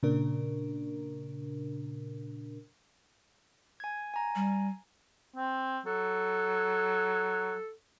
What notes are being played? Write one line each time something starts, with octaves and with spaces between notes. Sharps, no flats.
A#2 C#3 D4 A#4
G#5 G#6
G#5 A#5
G3
C4
F#3 A4